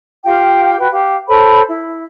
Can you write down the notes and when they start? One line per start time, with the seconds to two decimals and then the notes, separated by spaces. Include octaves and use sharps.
0.25 F4 G4 F5 G5
0.79 F#4 B4 G5
0.92 G4 F5
1.28 A4 C5 C#5 B5
1.69 E4